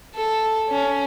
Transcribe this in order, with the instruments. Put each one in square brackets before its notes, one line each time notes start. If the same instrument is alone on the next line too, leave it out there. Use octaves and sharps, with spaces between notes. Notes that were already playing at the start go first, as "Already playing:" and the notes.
[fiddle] A4
C#4